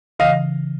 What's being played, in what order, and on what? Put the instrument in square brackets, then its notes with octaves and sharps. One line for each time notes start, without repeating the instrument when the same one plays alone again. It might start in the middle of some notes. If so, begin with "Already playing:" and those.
[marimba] C#3 E3 [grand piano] D#5 F5